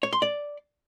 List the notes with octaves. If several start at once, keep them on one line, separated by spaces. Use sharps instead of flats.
C#5
C6
D5